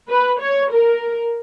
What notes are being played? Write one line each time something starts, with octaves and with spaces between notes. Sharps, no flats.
B4
C#5
A#4